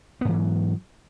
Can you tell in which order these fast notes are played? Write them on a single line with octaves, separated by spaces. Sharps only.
B3 G#2 E3 F#3